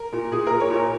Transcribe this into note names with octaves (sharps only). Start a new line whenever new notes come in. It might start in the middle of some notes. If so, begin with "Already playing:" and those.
Already playing: A#4
A#2
A#2 G#4
A#2 A#4
C#5
A#2
A#4